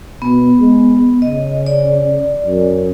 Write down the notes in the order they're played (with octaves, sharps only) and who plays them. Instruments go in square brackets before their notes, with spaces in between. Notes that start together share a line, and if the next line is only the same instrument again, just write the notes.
[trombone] B2 [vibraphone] B3
[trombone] G#3
[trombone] C#3 [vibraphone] D#5
[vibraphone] D5
[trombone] F#2